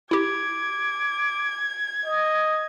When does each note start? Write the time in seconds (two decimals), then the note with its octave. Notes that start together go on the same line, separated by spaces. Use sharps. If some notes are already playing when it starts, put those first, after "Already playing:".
0.11 E4 G4 D6 G#6
2.06 D#5